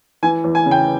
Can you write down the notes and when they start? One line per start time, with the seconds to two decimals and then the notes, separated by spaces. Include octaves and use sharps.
0.23 E3 G#5
0.44 E2
0.55 G#5
0.66 C#3
0.71 G5